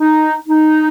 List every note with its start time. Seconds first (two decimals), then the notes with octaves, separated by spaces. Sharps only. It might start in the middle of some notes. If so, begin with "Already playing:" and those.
0.01 D#4
0.49 D#4